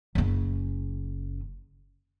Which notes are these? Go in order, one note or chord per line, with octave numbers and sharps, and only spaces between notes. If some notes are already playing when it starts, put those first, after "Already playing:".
F#1 C#3